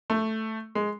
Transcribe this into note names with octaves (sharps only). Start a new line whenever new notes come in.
A3
G#3